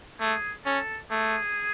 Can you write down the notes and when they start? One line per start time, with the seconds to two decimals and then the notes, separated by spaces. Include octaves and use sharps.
0.20 A3 G#4
0.65 C#4 A4
1.11 A3 G#4